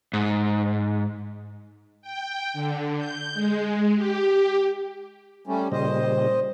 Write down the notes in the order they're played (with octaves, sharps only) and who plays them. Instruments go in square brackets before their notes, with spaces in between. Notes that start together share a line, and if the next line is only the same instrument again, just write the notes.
[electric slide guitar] G#2
[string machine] G5
D3
G6
G#3
G4
[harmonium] G3 A3 C#4
[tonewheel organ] A#2 C#3 G3 [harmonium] C5 D#5